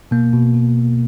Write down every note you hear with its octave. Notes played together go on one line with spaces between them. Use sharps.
B2 A#3
B2
B2